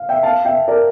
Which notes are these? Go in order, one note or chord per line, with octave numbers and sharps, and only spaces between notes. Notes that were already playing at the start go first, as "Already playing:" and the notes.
Already playing: F5
E5 G5
F5 A5
E5 G5
A#4 D5